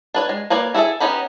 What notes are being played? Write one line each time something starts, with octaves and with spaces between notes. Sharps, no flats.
D4 B4 C#5
G#3
A#3 B4 C#5 D5
E4 F#4 G#4 A4 E5
B3 C#4 D#4 G4 B5